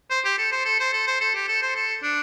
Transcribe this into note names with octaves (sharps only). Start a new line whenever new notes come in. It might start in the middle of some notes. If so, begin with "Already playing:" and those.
C5
G4
A4
C5
A4
C5
A4
C5
A4
G4
A4
C5
A4
D4